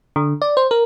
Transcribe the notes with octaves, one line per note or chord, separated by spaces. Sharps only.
D3
D5
C5
A#4